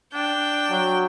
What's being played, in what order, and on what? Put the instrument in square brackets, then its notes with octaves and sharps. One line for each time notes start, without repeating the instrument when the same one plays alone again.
[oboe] D4 [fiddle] G5
[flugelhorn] F#3